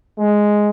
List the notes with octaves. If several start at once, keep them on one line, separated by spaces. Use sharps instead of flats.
G#3